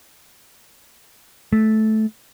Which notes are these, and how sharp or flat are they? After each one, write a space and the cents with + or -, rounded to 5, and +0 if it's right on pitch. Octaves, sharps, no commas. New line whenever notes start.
A3 -15